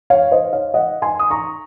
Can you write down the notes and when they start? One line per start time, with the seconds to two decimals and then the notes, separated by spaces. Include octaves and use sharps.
0.10 C#5 F5
0.31 C5 D#5
0.53 C#5 F5
0.74 D#5 F#5
1.02 G#5 C6
1.19 D#6
1.30 A#5 C#6